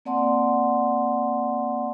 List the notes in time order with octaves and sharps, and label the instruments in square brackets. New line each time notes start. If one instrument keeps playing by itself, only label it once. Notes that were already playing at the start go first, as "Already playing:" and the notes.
[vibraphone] A#3 C4 D5 F#5 A5 C6